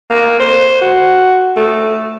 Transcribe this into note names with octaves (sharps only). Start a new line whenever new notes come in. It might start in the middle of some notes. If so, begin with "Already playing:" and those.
A#3
C5
F#4
A3